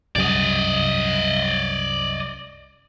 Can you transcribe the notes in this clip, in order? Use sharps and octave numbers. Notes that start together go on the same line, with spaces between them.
C2 F#2 G3 D5 D#5